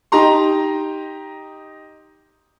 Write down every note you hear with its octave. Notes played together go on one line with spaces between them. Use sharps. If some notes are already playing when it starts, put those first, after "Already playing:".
D#4 G4 A#5 C6